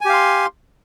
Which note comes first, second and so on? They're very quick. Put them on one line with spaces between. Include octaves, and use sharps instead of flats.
G#5 G4 F5 C6